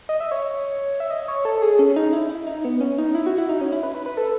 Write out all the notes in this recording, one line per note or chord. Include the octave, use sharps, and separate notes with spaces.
D#5
E5
C#5
E5
D#5
C#5
A4
G#4
C#4
D#4
E4
E4
D#4
B3
C#4
D#4
E4
F#4
E4
D#4
C#4
E4
B4
B4
B4
A4